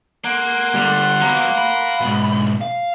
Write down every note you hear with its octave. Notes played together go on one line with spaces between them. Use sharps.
A#3 F#5 C6
D3 G3
F#3 B3 F5 A#5
B5
G#2 B2
F5